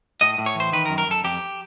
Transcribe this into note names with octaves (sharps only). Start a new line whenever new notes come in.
A2 D#5
A2
C#5
E3 C5
D#3 B4
A#4
F#2
A#4
F#2 A4
F2 G4